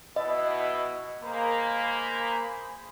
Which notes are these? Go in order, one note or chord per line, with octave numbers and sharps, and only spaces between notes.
B2 B3 E4 D#5
A#3 G#4 C5 B5